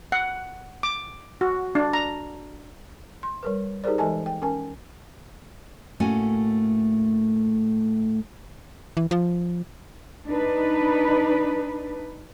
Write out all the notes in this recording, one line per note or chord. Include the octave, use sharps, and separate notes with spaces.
F#5
D6
F#4
D4
A#5
C6
G3 A#4 B4
D#4 G4 G#4 A#4 C5 D5
E3 G#3 A4 D#5 G#5 A5
G5
C#4 A#4 G#5 A5
A2 A3 A#3 C#4 F#4 G#5
E3
F3
D4 D#4 B4